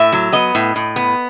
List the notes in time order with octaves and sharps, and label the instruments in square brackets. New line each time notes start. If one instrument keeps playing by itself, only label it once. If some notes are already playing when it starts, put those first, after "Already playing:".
Already playing: [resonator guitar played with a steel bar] A2 E5
F#3
B3 D#5
A2
A2
B3